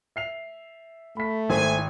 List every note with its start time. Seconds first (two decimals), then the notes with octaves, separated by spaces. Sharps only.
0.16 E5 C7 F7
1.17 A3 B5 B6
1.50 G#1 E4 C5 G#5